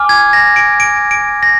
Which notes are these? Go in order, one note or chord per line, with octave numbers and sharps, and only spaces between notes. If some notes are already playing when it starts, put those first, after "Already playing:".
Already playing: G#5 D6 F6
G#6
A#6
D7
D7
D7
A#6